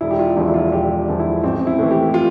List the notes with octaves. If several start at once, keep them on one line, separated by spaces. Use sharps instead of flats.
E1 E4
G4
F4
E2 D3 F3 E4
E4
F4
F4
E1 G4
E2 D3 F3
E4
A1 C4
E4
A2 E3
G4
F4